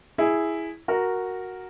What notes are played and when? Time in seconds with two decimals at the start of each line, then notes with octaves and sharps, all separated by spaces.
0.18 E4 G#4
0.88 F#4 A#4